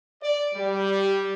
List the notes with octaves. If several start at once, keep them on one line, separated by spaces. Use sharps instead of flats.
D5
G3